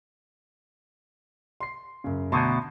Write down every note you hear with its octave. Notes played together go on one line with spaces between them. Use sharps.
C6 C7
F#2 C#3
D2 B2 A5 A#5 C6